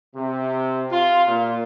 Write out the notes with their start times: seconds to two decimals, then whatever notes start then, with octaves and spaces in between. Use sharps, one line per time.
0.15 C3
0.91 F4
1.27 A#2